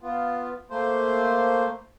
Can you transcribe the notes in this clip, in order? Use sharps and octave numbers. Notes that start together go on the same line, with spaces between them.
B3 F4
A3 A#3 C5